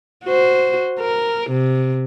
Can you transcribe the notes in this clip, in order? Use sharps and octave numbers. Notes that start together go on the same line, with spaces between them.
F#4 C5
A#4
C3